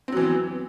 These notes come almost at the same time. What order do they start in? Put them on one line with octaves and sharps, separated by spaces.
C4 F#3 E3 B3